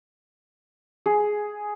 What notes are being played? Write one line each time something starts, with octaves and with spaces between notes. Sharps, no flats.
G#4